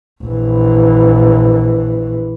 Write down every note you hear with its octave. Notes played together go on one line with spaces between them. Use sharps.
A#1 E3